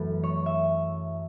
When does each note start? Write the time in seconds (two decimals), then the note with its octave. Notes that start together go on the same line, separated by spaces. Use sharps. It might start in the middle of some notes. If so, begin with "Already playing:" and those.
Already playing: F#2 E3 A3 E4 A4 B4
0.24 C#5
0.46 E5